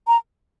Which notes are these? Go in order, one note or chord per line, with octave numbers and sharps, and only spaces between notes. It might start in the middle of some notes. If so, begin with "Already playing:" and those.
A#5